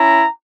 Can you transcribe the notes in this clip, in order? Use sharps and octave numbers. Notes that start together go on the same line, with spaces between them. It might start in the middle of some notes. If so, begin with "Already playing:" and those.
Already playing: C#4 E4 A#5